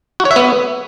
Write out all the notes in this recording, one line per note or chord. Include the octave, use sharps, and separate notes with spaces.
F#4
C#5
E5
B3